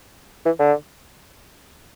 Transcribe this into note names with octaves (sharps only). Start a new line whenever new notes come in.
E3
D3